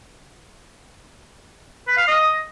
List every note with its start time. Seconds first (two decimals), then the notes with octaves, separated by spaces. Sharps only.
1.87 B4
1.97 F5
2.08 D#5